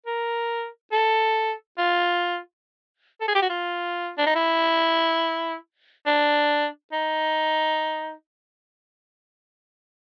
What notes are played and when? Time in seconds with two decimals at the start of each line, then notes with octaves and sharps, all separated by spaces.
0.06 A#4
0.92 A4
1.78 F4
3.21 A4
3.28 G#4
3.35 G4
3.42 F#4
3.50 F4
4.18 D4
4.27 D#4
4.35 E4
6.06 D4
6.92 D#4